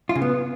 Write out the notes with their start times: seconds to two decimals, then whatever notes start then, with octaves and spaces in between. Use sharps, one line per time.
0.09 F4
0.15 C#3
0.22 B3